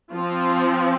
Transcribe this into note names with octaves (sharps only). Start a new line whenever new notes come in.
F3 C4 F4